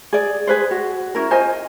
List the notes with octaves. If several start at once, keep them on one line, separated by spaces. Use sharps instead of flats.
G#4 D5
G#4 B4 C5
F#4
C#4 E4 A#4
F4 C5 D#5 G#5